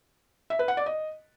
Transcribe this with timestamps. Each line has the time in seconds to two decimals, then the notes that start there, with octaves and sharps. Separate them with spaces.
0.50 E5
0.59 B4
0.68 F#5
0.77 D5
0.86 D#5